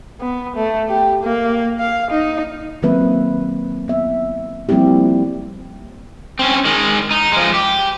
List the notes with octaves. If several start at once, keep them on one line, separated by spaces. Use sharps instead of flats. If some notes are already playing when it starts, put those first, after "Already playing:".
B3
A3
G4
A#3
F5
D#4
D#3 F#3 A#3 C4 B4 E5
B3 E5
F3 G3 A#3 C4 E4 G4
C4 C#4
D#3 G#3
D#4
F3 G#3
G4